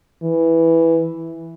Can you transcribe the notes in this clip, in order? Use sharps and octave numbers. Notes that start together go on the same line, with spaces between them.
E3